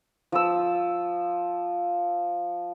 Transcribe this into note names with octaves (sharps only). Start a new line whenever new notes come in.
F3 E6